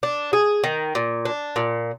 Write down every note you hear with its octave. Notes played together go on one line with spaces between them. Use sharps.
D4
G#4
D#3
A#2
D4
A#2